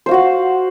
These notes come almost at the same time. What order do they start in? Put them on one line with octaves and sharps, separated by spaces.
C5 F5 F#4 F#5